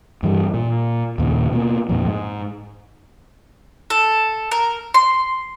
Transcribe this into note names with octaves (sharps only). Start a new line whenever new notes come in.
G2 E3 G3
A#2
D#2 A#2 C#3
B2 A#3
F2 A#2 F3
G#2
A4
A#4
C6